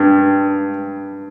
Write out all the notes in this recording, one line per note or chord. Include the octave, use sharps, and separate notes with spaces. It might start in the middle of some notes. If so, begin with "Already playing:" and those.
Already playing: G2